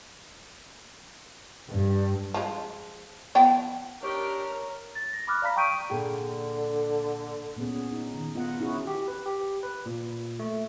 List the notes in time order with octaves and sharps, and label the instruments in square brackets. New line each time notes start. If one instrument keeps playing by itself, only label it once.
[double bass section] G2
[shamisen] F3 G#3
F3 B3 G5
[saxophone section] D4 D#4 G4 [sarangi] A#4 [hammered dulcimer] C#5
[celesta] A6
A#6
B5 D6 F6 F#6
D5 F5 A#5 B5 B6
G5 C#6 D#6 G6 D7 D#7
[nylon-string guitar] A#2 G#4 G5 [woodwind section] D3
[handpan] A#2 B3 C#4 G#4
D#4
D#3
B3 F4 D#5 F#5
C#4 D#4 E4 F#4 G#4
[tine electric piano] G4
B4
G4
B4
A#2
A3